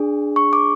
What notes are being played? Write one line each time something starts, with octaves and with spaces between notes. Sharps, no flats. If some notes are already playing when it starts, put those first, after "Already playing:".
Already playing: D4 G#4
C#6
D6